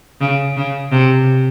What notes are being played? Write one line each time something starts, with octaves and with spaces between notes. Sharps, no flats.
C#3
C#3
C3